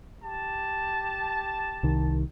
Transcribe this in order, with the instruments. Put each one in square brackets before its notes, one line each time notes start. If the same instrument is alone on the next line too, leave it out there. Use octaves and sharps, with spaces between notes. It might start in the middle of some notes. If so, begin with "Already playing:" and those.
[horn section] G4 A5
[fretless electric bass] C2 D#3